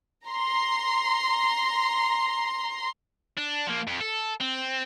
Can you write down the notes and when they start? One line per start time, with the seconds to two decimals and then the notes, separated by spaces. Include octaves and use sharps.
0.26 A#5 C6
3.37 D4
3.67 F3 A#3
3.87 F2
4.01 A4
4.41 C4